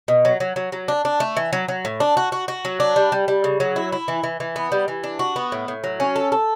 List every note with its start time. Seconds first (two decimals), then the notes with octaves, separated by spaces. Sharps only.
0.08 B2
0.25 F#3
0.40 F#3
0.56 F#3
0.72 F#3
0.88 D4
1.05 D4
1.20 A3
1.37 E3
1.53 F#3
1.68 F#3
1.85 A2
2.00 D4
2.17 F#4
2.32 F#4
2.48 F#4
2.65 F#3
2.80 D4
2.96 G3
3.12 G3
3.28 G3
3.44 C#3
3.60 F#3
3.76 E4
3.92 E4
4.08 E3
4.23 E3
4.40 E3
4.56 B3
4.72 G3
4.88 E3
5.04 D4
5.19 F#4
5.36 B3
5.52 A2
5.68 A2
5.84 F#3
6.00 C#4
6.16 A4
6.32 A4